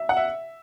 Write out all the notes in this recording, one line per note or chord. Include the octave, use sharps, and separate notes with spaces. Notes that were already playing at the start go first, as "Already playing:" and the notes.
Already playing: E5
F#5
E5